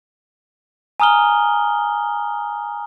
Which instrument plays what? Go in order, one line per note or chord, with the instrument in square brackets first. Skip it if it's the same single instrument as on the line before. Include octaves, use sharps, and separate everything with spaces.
[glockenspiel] G#5 A#5 D#6 F6 G7